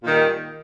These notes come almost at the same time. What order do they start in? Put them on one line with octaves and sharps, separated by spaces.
A#2 D#3 G3